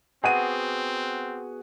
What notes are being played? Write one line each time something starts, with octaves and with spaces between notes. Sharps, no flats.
B3 C4 F#4 G#4 F#5 D#7